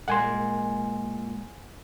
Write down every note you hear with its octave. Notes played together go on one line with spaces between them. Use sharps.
A#2 G#3 A#3 F#5 G#5 C6